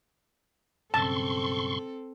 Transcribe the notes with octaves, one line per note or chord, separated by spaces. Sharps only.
B1 G2 C#3 C4 A4 A5 C6 C#6